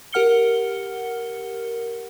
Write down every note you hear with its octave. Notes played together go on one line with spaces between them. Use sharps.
G4 A#4 F#5 F6 C#7 G7